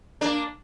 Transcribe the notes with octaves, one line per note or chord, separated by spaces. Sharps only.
A#3 D4